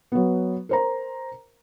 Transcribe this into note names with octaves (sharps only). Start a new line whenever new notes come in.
F#3 B3
A#4 C5 A#5